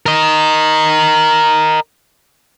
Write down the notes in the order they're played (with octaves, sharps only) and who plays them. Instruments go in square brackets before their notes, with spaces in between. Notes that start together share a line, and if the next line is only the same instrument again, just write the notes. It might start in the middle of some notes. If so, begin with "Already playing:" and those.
[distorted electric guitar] A#4 D#5